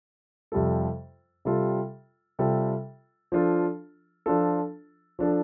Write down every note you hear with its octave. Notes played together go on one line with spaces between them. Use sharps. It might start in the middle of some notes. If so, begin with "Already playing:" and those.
F2 C3 G3 F4 A4
C3 G3 F4 A4
C3 G3 F4 A4
F3 D4 F4 A4
F3 D4 F4 A4
F3 D4 A4